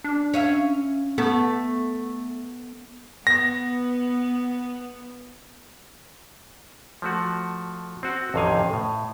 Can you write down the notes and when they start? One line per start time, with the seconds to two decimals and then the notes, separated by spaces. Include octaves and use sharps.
0.04 D4
0.34 C#4 E5 F5
1.18 A3 B3
3.27 B3 A#6
7.02 F3 A3 F#4
8.03 C4 F#4
8.34 A1 F2 C3 D#3 F5 G#5
8.73 A2